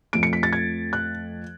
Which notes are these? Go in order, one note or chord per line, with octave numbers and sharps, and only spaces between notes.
F2 F3 A3 D7
C#7
B6
A6
G#6
F#6